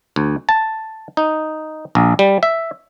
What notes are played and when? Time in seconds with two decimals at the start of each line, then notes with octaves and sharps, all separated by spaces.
0.16 D2
0.49 A5
1.17 D#4
1.95 A#1
2.19 G3
2.43 E5